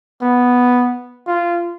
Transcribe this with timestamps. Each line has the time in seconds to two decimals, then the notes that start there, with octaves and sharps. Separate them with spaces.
0.22 B3
1.27 F4